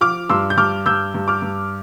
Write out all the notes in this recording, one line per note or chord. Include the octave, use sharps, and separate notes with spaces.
F3 D6 F6
G2 C6 E6
G6
G2 D6 F6
G2 E6 G6
G2
D6 F6
G2